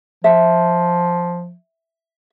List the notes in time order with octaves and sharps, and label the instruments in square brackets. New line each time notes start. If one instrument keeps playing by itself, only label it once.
[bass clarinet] F3 [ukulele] E5